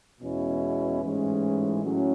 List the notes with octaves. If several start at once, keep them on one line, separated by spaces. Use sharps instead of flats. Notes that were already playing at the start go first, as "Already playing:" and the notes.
E2 B2 G#3 C#4 E4
A1 G#2 E3 G#3 C#4
A2 F#3 C#4